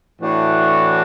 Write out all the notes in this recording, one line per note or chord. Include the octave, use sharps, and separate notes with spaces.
A2 E3 A3 D4 F#4